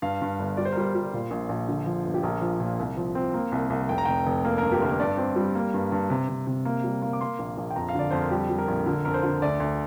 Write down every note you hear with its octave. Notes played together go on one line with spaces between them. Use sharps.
G2 F5
G2
G1
G3 D5
C5
A#4
G3 C5
G3
A#2
A#1
A#1
D3
F3
G1
G4
A#1 A#4
F3
A#2
C2
F3
C4
A#3
C2
C2
F1 G5
A#5
F1 G5
F1
A#3 A#4
G2 A#4
G4
G1 A#4
G2 D5
C4
G3
A#3
G2
G2
C3
C3
C3
A#3
G3
A#3
D6
A#3 C6
A#1
A#1
G5
F2 A#5
F5
D3 D5
F2 C5
A#4
G3 G4
G3
A#4
A#1
D3 A#4
F2 A#4
C5
D3
D2 D5
D2